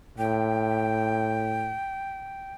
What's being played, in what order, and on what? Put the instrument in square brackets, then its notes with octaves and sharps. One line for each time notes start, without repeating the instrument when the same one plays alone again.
[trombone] A2 [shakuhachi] G5